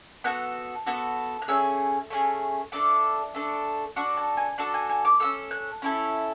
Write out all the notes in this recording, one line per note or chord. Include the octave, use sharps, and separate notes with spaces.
B3 F#4 A4 F#6
B3 F#4 A4
F#6
A3 C#4 G#4 E6
A3 C#4 G#4
A3 D4 A4 D6
A3 D4 A4
D4 F#4 A4 C#6
A5
G#5
D4 F#4 A4 A5
G#5
G#5
D6
C#4 E4 A4 E6
F#6
C#4 E4 A4